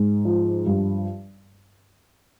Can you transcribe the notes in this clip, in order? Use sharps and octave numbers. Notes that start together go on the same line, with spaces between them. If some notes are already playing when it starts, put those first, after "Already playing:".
Already playing: G#2
F3
G2